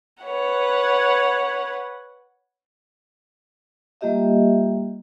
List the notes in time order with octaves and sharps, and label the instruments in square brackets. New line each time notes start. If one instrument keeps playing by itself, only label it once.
[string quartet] B4 C#5 F#5
[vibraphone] G3 A#3 F4 G4 D#5 E5